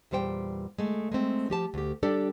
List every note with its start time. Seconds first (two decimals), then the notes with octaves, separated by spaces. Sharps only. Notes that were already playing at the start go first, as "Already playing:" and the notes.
0.11 E2 A#2 G3 C5 G5
0.78 G#3 A3
1.12 G#3 A3 C4
1.50 F3 G4 A5
1.74 D2 G4
2.03 G3 D4 G4 A4 D5